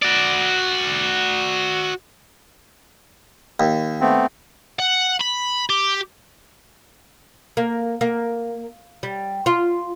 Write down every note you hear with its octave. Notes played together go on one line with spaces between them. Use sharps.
F#4 D5
D#2
A3 B3 C4
F#5
B5
G4
A#3
A#3
G3
F4